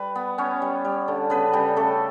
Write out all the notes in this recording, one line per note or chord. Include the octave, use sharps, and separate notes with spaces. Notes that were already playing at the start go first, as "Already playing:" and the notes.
Already playing: G3 B4
B3
B3 C#4 C#5
G3
G3
D3
C#3 B3 B4
C#3 G3 G4
C#3 A3 A4